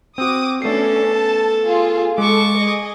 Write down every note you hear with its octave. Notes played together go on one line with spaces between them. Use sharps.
C4 F#4 D6 D#6
A3 B3 C#4 D4 A4 C7
A5
F4 G#4
G#3 A4 C#6 D6
G#4 D#5